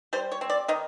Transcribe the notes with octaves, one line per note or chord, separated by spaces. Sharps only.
G3 C5
C#5
C4
D5
D#3 D#5